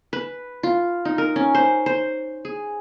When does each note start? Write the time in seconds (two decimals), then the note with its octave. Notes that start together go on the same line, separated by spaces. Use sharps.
0.13 B4
0.63 F4
1.05 D#4
1.18 A#4
1.36 C#4
1.55 C5
1.86 C5
2.45 G#4